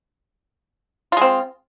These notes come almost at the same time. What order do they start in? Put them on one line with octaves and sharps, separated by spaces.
F4 G#3 C4